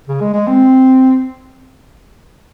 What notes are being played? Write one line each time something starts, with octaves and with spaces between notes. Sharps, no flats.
C#3
G#3
G#3
C4